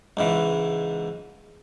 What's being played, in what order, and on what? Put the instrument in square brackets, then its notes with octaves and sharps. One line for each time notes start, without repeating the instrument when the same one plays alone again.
[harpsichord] C#2 G#2 E3